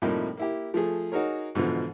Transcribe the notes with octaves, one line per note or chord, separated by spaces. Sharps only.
A2 C3 F3 G3 A#3 D#4
A#3 E4 G4
F3 A3 G#4
D#4 F#4 G#4 A#4 C#5
G#2 B2 D3 E3 F3